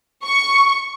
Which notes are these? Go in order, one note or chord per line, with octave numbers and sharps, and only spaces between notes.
C#6